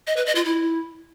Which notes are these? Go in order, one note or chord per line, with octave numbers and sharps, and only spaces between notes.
D#5
B4
D#5
F4
E4